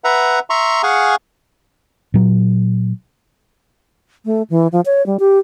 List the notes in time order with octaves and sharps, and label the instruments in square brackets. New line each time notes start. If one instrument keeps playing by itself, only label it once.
[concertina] B4 E5 F#5 A#5
E5 A#5 C6 C#6
G#4 F5 F#5 G#5 C#6
[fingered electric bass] A#2 F#3
[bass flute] A3
E3
F3
C#5
G3
G4